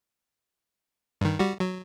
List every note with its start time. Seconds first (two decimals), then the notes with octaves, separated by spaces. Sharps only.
1.21 G2 D#3
1.39 G3 F#4
1.60 F#3